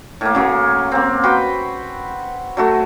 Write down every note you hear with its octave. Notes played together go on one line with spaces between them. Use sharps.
A2 A#3
C#3 F#3 A#3
A#3 C4
F#4 B4 C5 G5
F#3 A3 F#4